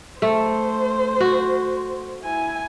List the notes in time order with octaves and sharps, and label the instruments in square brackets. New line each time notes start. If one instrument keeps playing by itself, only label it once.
[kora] A3 [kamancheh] C5
[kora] F#4
[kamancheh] E4 G#5